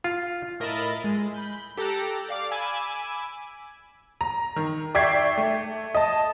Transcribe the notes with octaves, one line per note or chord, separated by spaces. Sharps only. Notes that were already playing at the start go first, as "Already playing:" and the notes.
F4
A2 A#4 D#5 E5 B5 A6
G#3
B5 G6
G4 A4 G5 A#5 D6 F#6
D5 F5 D6
G#5 B5 D6 E6 G#6
A#5
D#3
D5 E5 G5 C#6 G#6 C7
A3
D#5 A5